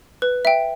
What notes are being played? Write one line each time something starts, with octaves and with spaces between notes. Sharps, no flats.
B4
E5 G5